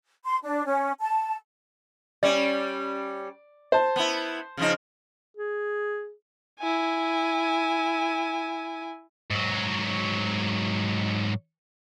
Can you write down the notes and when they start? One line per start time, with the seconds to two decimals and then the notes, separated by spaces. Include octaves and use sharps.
0.24 C6
0.44 D4
0.66 C#4
1.00 A5
2.23 G3 C#4 D5
3.72 C5 A5
3.96 B3 E4
4.57 C#3 F3 D#4
5.37 G#4
6.60 E4 G#5
9.30 G#2 F#3